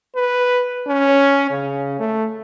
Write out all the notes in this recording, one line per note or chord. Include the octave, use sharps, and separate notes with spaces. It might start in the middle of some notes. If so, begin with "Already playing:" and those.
B4
C#4
C#3
A3